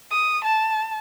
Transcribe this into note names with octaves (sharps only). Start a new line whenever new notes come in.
D#6
A5